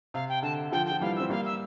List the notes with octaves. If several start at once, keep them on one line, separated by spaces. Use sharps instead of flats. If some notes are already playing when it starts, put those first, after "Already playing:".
C3 F5
G5
D3 A5
D3 F3 G5
G5
F3
E3 G3 F5
C4 E5
G3 A#3 F5
E5